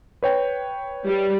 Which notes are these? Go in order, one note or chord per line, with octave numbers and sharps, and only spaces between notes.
B4 C#5 G5
G3